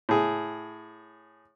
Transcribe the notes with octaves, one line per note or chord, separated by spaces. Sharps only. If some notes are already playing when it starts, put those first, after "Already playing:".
A2 G#4